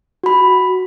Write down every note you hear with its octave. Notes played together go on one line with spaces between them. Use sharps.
F#4 B5